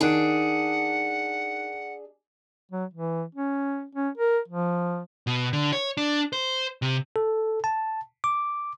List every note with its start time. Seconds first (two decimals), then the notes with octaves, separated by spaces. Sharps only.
0.01 D#3 D4 D#4 G#4 F#5 F#6 D7
2.71 F#3
2.94 E3
3.35 C#4
3.95 C#4
4.17 A#4
4.48 F3
5.27 B2
5.53 D3
5.73 C#5
5.97 D4
6.33 C5
6.82 C3
7.16 A4
7.64 A5
8.24 D6